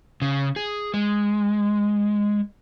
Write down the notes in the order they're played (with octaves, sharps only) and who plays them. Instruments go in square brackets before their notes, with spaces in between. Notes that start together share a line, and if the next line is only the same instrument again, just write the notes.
[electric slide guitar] C#3
G#4
G#3